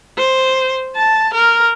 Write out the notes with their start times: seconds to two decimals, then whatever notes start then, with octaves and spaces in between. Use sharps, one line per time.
0.18 C5
0.96 A5
1.34 A#4